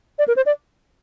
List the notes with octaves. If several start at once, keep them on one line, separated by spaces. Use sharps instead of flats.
D5
A#4
C5
D5